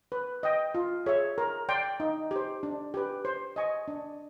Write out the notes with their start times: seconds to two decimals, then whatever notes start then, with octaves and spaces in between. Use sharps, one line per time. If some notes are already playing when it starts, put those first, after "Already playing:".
0.12 B4
0.43 D#5 G5
0.75 F4
1.06 G#4 C#5 E5
1.38 A#4
1.69 D5 G5 C6
2.00 D#4
2.31 G4 C5
2.63 D4
2.94 G4 B4
3.25 C5
3.56 D#5 G#5 C#6
3.88 D4